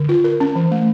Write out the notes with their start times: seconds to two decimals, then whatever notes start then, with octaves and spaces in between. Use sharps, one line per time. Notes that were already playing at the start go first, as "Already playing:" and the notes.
Already playing: D3
0.09 F4
0.24 A#4
0.40 C#4
0.56 E3
0.71 A3